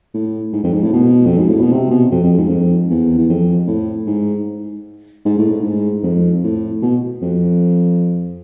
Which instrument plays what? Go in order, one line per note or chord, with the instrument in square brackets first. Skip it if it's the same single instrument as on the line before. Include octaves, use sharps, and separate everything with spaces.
[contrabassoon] A2
G#2
F2
G#2
A2
B2
F2
G#2
A2
B2
C3
B2
F2
F2
G#2
F2
E2
E2
F2
A2
G#2
G#2
A2
A2
G#2
F2
A2
B2
F2